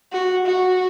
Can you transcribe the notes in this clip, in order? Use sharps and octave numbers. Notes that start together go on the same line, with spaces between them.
F#4
F#4